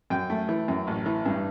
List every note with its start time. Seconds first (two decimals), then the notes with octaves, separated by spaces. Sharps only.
0.10 F#2 G5
0.30 A3
0.49 E3
0.68 F#2
0.87 A1
1.06 E3
1.25 G2